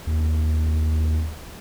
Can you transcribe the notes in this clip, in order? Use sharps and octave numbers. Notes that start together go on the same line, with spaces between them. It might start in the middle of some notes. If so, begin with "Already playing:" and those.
D#2